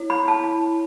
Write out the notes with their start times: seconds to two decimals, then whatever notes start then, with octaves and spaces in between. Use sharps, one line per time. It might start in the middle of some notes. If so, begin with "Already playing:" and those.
Already playing: E4 C#5
0.10 B5
0.28 A5